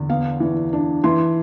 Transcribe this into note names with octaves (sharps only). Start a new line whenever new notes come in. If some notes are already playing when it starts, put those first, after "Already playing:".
Already playing: E2 D3
B3 F5
E3
D4
E3 C6